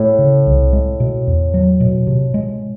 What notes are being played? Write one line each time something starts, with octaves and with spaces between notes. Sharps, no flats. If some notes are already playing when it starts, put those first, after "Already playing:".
Already playing: A2
C#3
C2
G#3
B2
E2
F#3
B2
C3
G#3